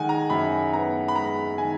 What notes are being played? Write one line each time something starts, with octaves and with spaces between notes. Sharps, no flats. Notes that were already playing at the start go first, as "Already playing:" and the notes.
Already playing: D#3 G#3 F#5 G#5
A#5
F#2 B5
B3 A#5
B5
G#3 A#5
D#3 G#5